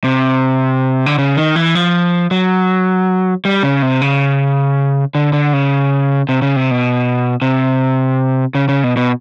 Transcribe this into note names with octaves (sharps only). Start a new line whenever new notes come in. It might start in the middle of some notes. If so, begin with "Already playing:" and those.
C3
D3
C#3
D#3
E3
F3
F#3
G3
C#3
C3
C#3
D3
D3
C#3
C3
C#3
C3
B2
C3
C#3
C#3
B2
B2